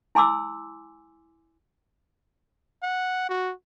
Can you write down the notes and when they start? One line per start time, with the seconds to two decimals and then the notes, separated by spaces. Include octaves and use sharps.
0.15 E4 G#5 C6 D6 E6
2.83 F#5
3.29 F#4